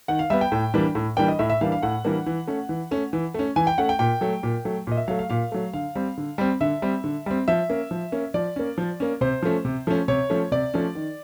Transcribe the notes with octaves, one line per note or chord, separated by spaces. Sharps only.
D#3 F#5
F5
G3 B3 E5
G5
A2
E3 G3 A#3 D4
A2
E3 G3 A#3 D4 G5
D#5
A2 E5
E5
E3 G3 A#3 D4 F5
F5
A2 F#5
E3 G3 A#3 D4
E3
A3 C#4
E3
A3 C#4
E3
A3 C#4
E3 G#5
G5
A3 C#4 F#5
G5
A#2 G5
F#3 A3
A#2
F#3 A3
A#2 D#5
E5
F#3 A3 F5
F5
A#2 F5
F#3 A3
D3 F5
G3 C4
D3
G3 C4
D3 E5
G3 C4
D3
G3 C4
F3 E5
A#3 C#4
F3
A#3 C#4
F3 D5
A#3 C#4
F3
A#3 C#4
C3 C5
F3 A3 C#4
C3
F3 A3 C#4
C3 C#5
F3 A3 C#4
C3 D5
F3 A3 C#4
D#3